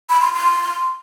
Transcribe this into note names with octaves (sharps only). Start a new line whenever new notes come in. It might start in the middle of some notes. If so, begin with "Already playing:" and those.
B5
C6
C6